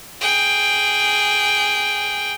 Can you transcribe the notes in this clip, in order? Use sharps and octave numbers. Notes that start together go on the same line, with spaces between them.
G#4 G5